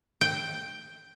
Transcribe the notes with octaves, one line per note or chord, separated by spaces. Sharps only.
G5